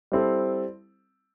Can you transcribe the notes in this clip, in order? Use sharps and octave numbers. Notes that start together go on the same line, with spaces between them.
G3 C4 E4 A4 C5